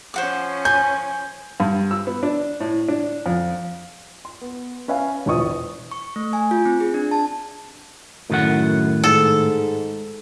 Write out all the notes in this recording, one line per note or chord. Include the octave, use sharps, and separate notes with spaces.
F3 C#4 C5 F#5 D6
G#5 G6
G2
E6
B3
D4
A2
D4
F2
C6
B3
C#4 B4 E5 F5 G#5
E1 A#1 E3 D5 C#6 D#6
C#6
A3
G#5
F4
C4
G#4
D4
A5
F#2 A2 D#3 F#5
G#2 A4